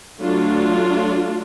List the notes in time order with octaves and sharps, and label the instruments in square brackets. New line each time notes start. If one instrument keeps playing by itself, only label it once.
[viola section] F#3 A3 D4 F4